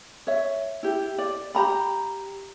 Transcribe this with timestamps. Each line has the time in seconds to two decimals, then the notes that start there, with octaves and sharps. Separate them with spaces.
0.27 C#5 E5
0.83 E4 G4
1.18 D5
1.55 G4 A#5 B5